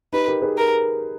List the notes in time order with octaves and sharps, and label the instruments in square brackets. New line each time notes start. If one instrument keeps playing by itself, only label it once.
[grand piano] D#4 G4 [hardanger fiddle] B4
[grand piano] G4 A#4
G#4 B4
[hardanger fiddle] A#4